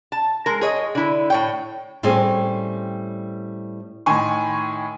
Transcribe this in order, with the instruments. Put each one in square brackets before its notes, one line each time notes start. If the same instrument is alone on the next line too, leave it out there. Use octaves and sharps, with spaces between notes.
[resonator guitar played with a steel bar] A5
G#3 A#4
G#4 C#5 D#5
D3 E4
A2 C#5 G5
[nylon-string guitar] A2 G3 C4 C#4 G#4
[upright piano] A2 D#3 G#5 C6 C#6